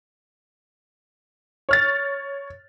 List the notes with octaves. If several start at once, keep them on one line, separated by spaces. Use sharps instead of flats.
C#5 F6 A6